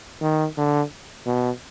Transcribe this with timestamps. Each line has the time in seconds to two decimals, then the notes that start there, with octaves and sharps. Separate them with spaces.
0.22 D#3
0.57 D3
1.26 B2